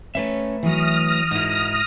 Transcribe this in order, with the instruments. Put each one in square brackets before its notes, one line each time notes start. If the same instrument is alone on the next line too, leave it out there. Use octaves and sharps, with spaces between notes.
[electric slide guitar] A3 B4 E5 [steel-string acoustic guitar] C#4 C#5
[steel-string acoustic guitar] E3 F#3 C#5 [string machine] D#6 F6 A#6
[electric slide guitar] G#2 E4 [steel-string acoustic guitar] D#4 F#4 A#4